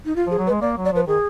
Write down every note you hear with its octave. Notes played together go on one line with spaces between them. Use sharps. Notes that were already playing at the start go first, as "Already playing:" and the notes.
D#4
F4
F3
G#4
F#3
B4
G#3
A#3 D5
F#3
D5
F3 B4
D#3 G#4